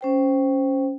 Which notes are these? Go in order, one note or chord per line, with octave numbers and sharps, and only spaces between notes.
C#4 C5 G5